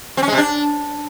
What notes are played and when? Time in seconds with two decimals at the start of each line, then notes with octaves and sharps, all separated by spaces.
0.17 C4
0.22 C#4
0.28 G#3
0.33 C3
0.38 D4